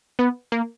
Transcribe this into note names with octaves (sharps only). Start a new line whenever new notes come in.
B3
A#3